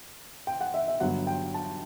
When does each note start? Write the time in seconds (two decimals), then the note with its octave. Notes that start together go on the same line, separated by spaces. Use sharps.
0.47 G5
0.61 F#5
0.74 E5
0.88 E5
1.00 G1 G2 F#3 F#5
1.27 G5
1.54 A5